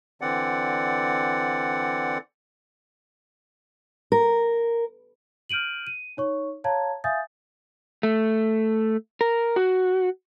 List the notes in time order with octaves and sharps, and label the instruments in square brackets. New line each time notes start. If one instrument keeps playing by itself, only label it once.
[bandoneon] D3 E3 C4 D5 F#5
[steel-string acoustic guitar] A#4
[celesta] F6 G6 D7 D#7 F#7
D#7
D#4 C#5 C#6
C#5 F5 A5 A#5 G#6
E5 F5 G#5 D#6 G6 A6
[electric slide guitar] A3
A#4
F#4